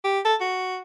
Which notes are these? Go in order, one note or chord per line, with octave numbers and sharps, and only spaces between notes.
G4
A4
F#4